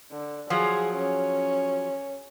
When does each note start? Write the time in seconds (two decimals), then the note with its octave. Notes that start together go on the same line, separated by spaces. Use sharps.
0.11 D3
0.50 F3 F#3 G#4
0.97 C#4